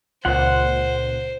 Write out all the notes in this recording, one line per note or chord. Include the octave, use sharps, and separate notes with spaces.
C#2 A#2 C5 F#5 C6